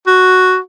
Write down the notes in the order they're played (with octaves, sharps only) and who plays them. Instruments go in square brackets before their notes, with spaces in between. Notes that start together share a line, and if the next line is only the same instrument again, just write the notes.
[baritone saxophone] F#4